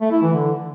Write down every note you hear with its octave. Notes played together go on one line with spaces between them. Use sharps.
A3
E4
E3
D3